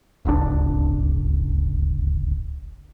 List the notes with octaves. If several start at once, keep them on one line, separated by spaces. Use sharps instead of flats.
D1 G1 C#2 D4